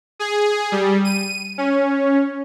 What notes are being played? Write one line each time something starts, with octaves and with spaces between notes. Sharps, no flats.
G#4
G3
D#7
C#4